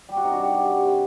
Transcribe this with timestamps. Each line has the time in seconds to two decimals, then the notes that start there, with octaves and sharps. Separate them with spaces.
0.09 G3 G4
0.16 F#4
0.24 C3 D#4
0.32 D4 F#4
0.40 G3
0.55 C3
0.70 G3
0.86 C3